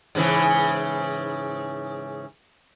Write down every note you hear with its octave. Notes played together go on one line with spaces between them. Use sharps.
G#2 C#3 E3